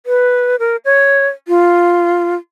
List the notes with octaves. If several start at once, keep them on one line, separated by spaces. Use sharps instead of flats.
B4
A#4
C#5
F4